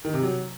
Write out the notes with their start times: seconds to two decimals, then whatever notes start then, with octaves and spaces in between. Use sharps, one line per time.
0.05 D#3
0.14 C3
0.23 F#3